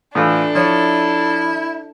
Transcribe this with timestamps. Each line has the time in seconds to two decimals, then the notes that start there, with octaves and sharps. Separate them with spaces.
0.15 A2 E3 D4 F4 A4
0.55 F3 E4 C#5